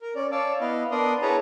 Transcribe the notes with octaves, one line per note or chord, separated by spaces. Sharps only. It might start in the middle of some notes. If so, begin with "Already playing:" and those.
A#4
C#4 D5
C#5 D5 F5 A5 D6 E6
B3 E4 D#5 F5
B3 D4 A#4 D5 C6 D#6
E4 G#4 B4 C#5 A5 A#5